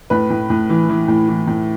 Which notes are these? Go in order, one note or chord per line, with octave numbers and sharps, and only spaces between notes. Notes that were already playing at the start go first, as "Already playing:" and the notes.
A2 B4
A2
A2
E3
E3
A2
E3
A2